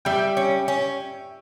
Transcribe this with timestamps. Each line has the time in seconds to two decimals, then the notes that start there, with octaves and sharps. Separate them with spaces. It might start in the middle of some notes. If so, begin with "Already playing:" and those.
0.05 G3 E5 G5
0.37 C#4
0.68 C#4